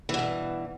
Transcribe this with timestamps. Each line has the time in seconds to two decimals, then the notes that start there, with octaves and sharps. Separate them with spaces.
0.09 E3
0.14 B2
0.19 G2